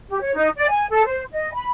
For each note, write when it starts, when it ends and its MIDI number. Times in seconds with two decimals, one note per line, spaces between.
0.10 0.18 67
0.21 0.33 73
0.34 0.48 63
0.56 0.69 74
0.69 0.85 80
0.90 1.04 69
1.05 1.22 72
1.32 1.51 75
1.53 1.71 83